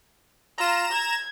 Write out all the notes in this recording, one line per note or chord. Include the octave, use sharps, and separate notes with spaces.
F4 A#5 E7
G#6